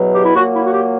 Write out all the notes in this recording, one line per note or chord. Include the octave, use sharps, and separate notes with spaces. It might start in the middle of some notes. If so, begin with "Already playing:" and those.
Already playing: E2 B2 F#3
G4
E4
A#2 F#3 A#3 F#4
E4
F#4
G4